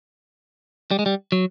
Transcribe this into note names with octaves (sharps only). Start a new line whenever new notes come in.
G3
G#3
G3
F#3